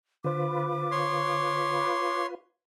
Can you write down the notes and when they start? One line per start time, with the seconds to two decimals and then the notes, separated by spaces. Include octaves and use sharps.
0.24 D3 F4 B4 C5 D6
0.91 C#5 C6